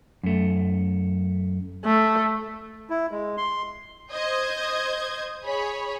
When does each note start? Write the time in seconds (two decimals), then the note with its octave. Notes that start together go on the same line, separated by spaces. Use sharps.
0.24 F#2 A3
1.85 A3
2.90 E4
3.11 G#3
3.37 C6
4.12 C5 D#5 G6 G#6
5.45 G#4 C#5 B5